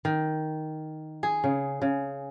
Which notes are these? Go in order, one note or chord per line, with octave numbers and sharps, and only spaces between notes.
D#3
G#4
C#3
C#3